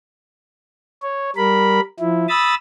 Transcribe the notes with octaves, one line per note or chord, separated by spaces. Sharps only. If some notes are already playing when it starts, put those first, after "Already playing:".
C#5
G3 A#4 B5
F3 E4
B5 D#6 E6 A6